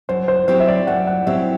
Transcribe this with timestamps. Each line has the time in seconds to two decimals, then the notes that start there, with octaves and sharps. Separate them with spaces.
0.09 F#2 C5
0.28 C5
0.48 F#3 C4 E4 G4 C5
0.60 E5
0.68 D5
0.87 F#2 F#5
1.07 F#5
1.27 F#3 C4 E4 G4 E5